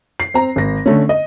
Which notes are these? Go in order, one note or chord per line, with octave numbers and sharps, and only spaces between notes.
C7
C4 A#5
G#1 A#6
D3 A3 C#4
D#5